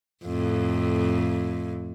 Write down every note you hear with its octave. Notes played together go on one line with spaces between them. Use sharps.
F2 A2